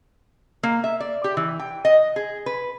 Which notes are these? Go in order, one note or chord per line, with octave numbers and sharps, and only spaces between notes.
A#3
E5
D5
G4
E3
G5
D#5
G#4
B4